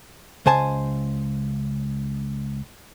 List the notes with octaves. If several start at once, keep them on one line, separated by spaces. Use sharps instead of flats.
C#2 C#3 C5 G#5 A5